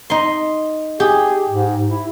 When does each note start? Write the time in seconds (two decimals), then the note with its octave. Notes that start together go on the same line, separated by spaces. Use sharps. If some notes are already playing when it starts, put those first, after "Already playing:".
0.10 D#4 C6
1.00 G4 G#4
1.49 G#2
1.88 E4